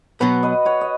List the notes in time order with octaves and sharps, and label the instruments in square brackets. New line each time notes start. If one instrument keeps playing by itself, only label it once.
[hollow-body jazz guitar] B2 F#3 B3 [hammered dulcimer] F#4 B4
[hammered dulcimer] B4 D#5
C#5 F#5
D#5